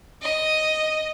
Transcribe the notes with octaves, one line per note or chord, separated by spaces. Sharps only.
D#5